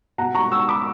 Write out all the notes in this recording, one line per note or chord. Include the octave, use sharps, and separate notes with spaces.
B2 F#5 A#5
A#5 C#6
C#6 E6
B5 D6